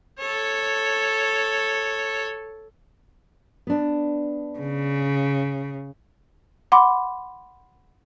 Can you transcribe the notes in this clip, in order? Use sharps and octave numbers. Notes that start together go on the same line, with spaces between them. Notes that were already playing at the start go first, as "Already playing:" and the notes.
A4 C#5
B3 D4
C#3
F#5 B5 C6 D6